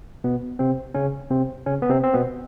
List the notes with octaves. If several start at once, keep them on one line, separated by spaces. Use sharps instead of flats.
B2 B3
C3 C4
C#3 C#4
C3 C4
C#3 C#4
B3
C3 C4
C4
B2 B3